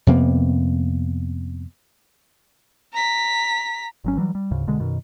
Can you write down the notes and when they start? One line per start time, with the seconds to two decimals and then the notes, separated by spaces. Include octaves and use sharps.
0.07 F2 C3 A#3 B3
2.93 A#5 B6
4.04 G#1 F#3 C#4
4.17 E3 F#3 G3
4.35 G3
4.51 D2 G#2 C#3
4.67 B1 B2 D3 G#3
4.79 F#2 B2 D#3